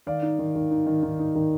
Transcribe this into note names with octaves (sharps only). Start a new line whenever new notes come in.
D#3 D5 F5
D#4
D#3
D#3
D#4
D#3
D#3
D#4
D#3